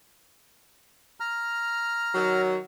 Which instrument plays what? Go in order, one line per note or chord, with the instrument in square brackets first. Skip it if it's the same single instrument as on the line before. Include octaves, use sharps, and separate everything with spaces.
[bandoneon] A#5 F6
[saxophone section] D#3 F#3